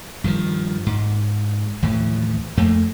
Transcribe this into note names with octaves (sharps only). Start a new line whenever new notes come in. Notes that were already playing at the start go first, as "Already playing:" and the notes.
G2 D#3 F3
G#2
D#2 A2 E3 F3
F2 A3 A#3